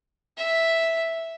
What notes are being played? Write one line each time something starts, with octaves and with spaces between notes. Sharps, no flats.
E5